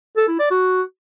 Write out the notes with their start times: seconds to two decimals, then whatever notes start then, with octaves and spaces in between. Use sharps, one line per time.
0.17 A4
0.28 E4
0.39 D5
0.51 F#4